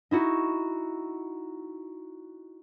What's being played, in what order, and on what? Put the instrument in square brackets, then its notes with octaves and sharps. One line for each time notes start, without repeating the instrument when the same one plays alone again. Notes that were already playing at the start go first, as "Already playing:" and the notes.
[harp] D#4 E4 F#4